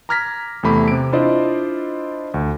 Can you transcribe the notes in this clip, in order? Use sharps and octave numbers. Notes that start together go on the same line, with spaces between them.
A#5 D6 F6 G#6 A#6 B6
E2 C3 A3 B5 D6
C3 D7
D4 E4 F4 C5 D5 D#5
D2